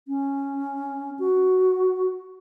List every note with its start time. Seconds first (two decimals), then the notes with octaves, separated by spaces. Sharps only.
0.08 C#4
1.19 F#4